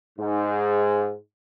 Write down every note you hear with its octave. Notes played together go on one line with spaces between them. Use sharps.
G#2